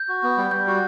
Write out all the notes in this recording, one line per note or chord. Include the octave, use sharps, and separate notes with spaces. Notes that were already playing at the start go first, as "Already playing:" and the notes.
Already playing: G6
F#4
B3
G3
G3 G6
F#4